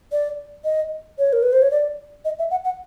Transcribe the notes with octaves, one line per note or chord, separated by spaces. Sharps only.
D5
D#5
C#5
A#4
B4
C5
C#5
D5
D#5
E5
F#5
F#5